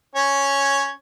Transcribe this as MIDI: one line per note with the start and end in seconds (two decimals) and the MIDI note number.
0.15 0.91 61
0.15 0.91 73